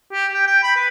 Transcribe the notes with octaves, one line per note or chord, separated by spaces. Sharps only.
G4
G5
G5
B5
B4